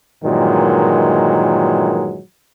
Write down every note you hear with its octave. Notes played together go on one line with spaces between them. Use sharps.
G2 A#2 D#3 E3 F#3 G#3